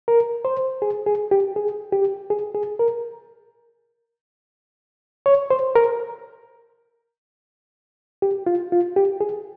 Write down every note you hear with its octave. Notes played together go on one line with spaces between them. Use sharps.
A#4
C5
G#4
G#4
G4
G#4
G4
G#4
G#4
A#4
C#5
C5
A#4
G4
F4
F4
G4
G#4